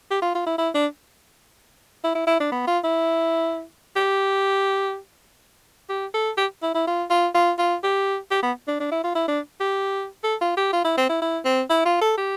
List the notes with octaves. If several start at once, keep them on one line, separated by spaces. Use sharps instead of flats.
G4
F4
F4
E4
E4
D4
E4
E4
E4
D4
B3
F4
E4
G4
G4
A4
G4
E4
E4
F4
F4
F4
F4
G4
G4
B3
D4
D4
E4
F4
E4
D4
G4
A4
F4
G4
F4
E4
C4
E4
E4
C4
E4
F4
A4
G4